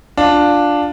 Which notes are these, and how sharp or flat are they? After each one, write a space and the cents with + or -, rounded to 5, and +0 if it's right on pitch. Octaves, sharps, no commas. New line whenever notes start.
D4 +0 F4 +10